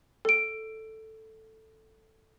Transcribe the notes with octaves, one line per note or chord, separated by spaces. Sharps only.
A4 D7